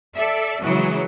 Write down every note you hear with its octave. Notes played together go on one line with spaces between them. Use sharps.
A4 D5 E5
C#3 E3 F#3 G#3